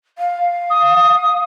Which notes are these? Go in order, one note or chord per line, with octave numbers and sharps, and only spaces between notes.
F5
D#6